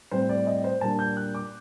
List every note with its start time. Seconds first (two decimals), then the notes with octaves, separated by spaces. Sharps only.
0.11 A2 G3 C4 C5
0.29 D5
0.47 D#5
0.64 C5
0.81 A#2 G3 A#3 D4 A5
0.99 G6
1.17 F#6
1.35 D6